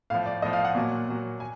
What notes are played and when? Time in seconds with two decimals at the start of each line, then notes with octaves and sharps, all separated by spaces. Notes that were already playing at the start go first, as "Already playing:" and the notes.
0.10 A2 F3 F5
0.26 D5
0.42 A2 F3 D#5
0.53 F5
0.65 F#5
0.75 A#2 F#3
1.09 A#2 F#3
1.40 G#5